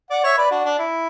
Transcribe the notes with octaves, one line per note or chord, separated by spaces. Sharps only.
D5 F#5
C#5 E5
B4 D5
D4 F#4
D4
E4